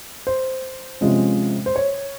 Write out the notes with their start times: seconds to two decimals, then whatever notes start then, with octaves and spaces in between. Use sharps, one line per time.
0.27 C5
1.01 C3 F3 G#3 C#4
1.66 C5
1.76 C#5